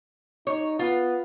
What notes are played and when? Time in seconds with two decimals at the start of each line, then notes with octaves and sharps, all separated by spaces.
0.47 D#4 C#5
0.79 B3 F4